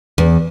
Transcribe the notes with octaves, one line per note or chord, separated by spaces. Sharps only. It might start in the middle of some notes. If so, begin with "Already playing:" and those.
E2